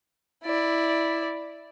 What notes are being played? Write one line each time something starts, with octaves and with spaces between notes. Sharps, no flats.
E4 D5